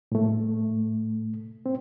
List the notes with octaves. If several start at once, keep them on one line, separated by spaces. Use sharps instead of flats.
A2 A3
C4